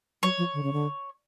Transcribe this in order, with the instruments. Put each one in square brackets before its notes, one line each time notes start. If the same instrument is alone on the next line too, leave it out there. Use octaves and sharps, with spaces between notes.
[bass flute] F#3 [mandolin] C#5
[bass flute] F3
D3
C#3
D3